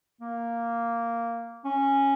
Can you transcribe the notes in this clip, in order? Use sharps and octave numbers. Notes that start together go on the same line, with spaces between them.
A#3
C#4